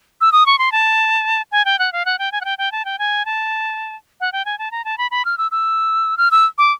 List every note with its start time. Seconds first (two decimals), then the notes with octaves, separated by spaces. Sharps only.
0.21 E6
0.32 D#6
0.46 C#6
0.59 C6
0.72 A5
1.52 G#5
1.65 G5
1.79 F#5
1.93 F5
2.05 F#5
2.19 G5
2.32 G#5
2.41 F#5
2.45 G5
2.58 G5
2.72 A5
2.85 G5
2.99 G#5
3.25 A5
4.21 F#5
4.32 G5
4.45 G#5
4.59 A5
4.71 A#5
4.85 A5
4.98 B5
5.11 B5
5.25 F6
5.38 E6
5.51 E6
6.17 F6
6.31 E6
6.58 D6